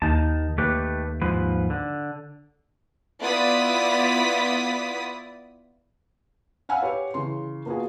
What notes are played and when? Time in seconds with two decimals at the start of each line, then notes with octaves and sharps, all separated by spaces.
0.02 D#2 D#3 D#4 A5
0.58 D#2 A3 G4 B4
1.22 G#2 F3 B4
1.70 D3
3.20 B3 E4 F4 D5 D#6 B6
6.69 F5 F#5 G#5 B5 E6 F6
6.82 G4 B4 C#5
7.14 C#3 E3 C6
7.66 A#3 B3 F4 F#4 G#4